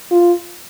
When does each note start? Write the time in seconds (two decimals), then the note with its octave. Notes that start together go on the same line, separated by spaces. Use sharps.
0.11 F4